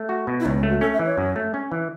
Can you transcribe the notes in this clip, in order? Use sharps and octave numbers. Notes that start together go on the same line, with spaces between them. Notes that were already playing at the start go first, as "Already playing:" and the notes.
Already playing: A3
F#4
B2
E4
C#2 C#4
C#4
A3
F#4
C#4 A4
E5
E3
C#5
F#2
A3
C#4
E3